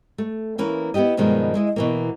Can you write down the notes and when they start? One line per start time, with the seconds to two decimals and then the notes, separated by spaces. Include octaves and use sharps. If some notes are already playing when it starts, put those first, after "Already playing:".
0.18 A3
0.58 E3 A#3 C#4 B4
0.94 B3 E4 F4 G4 D#5
1.17 G2 B2 D#3 F3 G#3 D4
1.54 G#3 E4 D#5
1.76 B2 E3 A#3